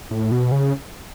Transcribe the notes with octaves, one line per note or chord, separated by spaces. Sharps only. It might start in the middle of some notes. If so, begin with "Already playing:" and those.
A2
B2
C#3